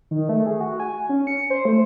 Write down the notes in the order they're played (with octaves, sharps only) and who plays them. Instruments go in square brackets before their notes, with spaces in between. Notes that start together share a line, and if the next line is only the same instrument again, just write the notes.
[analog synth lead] D#3
A3
G#4
F#4
G#5
C#4
C#7
C5
A3